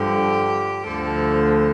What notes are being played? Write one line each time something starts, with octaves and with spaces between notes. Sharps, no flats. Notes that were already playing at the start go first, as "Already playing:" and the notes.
Already playing: G2 D3 F3 G4
D2 D3 F3 A4